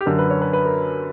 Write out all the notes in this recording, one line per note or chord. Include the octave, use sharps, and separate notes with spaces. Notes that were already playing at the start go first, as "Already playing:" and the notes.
G4
F#2 D3 A#4
B4
C#5
B4
B4
A#4